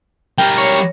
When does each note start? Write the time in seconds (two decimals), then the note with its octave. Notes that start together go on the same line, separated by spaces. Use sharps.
0.38 G3 A#4 G5
0.58 C#5